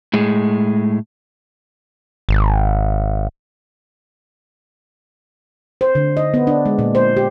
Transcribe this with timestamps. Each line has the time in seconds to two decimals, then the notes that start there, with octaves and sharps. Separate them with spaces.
0.14 A2 G#3
2.29 G#1
5.81 C5
5.95 D3
6.17 D#5
6.34 B3
6.47 D4
6.66 G#3
6.79 A#2
6.95 C5
7.17 G4